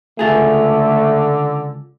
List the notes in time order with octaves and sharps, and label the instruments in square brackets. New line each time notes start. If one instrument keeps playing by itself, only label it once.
[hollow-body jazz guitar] C#2 F4 G#4 [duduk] D3 [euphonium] A3